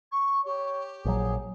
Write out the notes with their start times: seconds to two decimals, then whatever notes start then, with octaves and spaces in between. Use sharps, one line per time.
0.12 C#6
0.46 G4 C#5
1.05 A#1 F#3 G#4